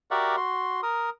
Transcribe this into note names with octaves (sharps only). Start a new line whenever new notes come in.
F#4 G4 A#4 D5 E5 F#5
F#4 C6
A#4 D#6